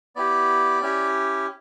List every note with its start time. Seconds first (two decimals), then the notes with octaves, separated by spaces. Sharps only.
0.16 B3 E4 G4 D5
0.81 C#4 E4 G4